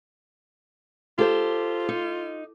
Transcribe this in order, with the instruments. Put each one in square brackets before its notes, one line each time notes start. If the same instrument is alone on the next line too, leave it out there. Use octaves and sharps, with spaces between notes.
[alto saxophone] F4 [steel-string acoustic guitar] G4 A4 C5
[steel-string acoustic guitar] D#4